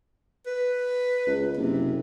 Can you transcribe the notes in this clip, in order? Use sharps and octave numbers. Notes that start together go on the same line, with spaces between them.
B4
C#2
F#1 C3